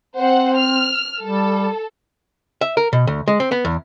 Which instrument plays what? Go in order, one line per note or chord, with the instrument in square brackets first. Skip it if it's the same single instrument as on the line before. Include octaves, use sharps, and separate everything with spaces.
[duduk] C4 [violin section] C5 F#5
[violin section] F6
[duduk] G3 [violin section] A4
[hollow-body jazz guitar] E5
A#4
B2
D2
G#3
C4
B3
E2